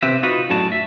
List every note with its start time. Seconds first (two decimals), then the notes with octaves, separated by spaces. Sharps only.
0.03 C3 C4 G4 B4 E5
0.23 D#4 F4 F#4 B4
0.50 F#2 A2 F#4 D5 A5
0.72 E5